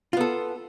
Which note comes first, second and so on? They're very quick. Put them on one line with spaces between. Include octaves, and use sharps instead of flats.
F4 B3 A4